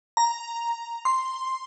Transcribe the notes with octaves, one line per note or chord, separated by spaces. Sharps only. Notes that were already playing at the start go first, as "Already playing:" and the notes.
A#5
C6